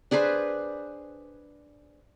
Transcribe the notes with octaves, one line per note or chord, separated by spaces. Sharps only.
D4 G#4 B4 C5